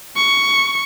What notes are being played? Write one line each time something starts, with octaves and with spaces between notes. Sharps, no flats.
C#6